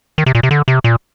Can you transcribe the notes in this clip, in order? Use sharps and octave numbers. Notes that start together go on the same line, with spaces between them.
D#3
C3
A#2
C3
D3
C3
A#2